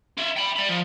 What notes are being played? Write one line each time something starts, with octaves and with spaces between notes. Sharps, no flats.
F4 E5
G5 B5
D5 B5
F3